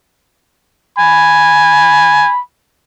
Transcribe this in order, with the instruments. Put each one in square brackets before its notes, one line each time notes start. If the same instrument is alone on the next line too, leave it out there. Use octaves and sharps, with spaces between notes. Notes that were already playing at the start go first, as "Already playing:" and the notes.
[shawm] G#5 [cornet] B5